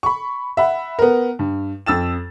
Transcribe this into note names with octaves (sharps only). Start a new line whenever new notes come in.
B5 C#6
E5 F#5 B5
B3 A#4
G2
F2 E6 A6 E7